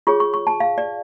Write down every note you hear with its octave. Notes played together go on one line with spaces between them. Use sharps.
F4 G#4 C#5 C#6
C#6
C#6
A5
F5
D5